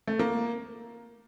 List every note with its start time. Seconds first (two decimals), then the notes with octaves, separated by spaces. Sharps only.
0.08 A3
0.19 A#3